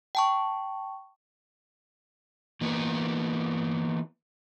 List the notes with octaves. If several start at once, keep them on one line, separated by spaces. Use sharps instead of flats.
G5 A5 C#6
E3 A#3 B3 F#4